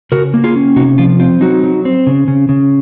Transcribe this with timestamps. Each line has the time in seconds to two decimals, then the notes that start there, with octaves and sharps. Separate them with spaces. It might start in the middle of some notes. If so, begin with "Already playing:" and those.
0.12 C#3 F#4 A#4
0.34 A#3
0.44 F4 G#4
0.56 C#4
0.76 C3 D#4 F#4
0.98 F3 F4
1.20 C4 F4
1.41 F#3 D#4 F#4
1.63 F#3
1.85 C4
2.07 C#3
2.28 C#3
2.49 C#3